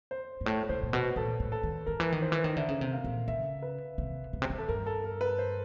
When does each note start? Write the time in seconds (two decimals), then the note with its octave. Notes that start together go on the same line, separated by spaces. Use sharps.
0.11 C5
0.41 G#2
0.46 A2 C#5
0.69 B2 C5
0.83 A#2
0.93 B2 B4
1.16 A#2 A4
1.40 A2
1.52 A4
1.63 D#3
1.86 D#3 A#4
2.00 E3
2.12 D#3
2.22 C5
2.32 E3
2.44 D#3
2.57 D3 E5
2.69 C#3
2.81 C3
2.92 F5
3.04 A#2
3.28 C#3 E5
3.62 B4
3.98 C3
4.33 B2
4.42 C3
4.50 B2
4.58 A4
4.68 G2 A#4
4.86 A4
5.04 A#4
5.21 B4
5.38 C5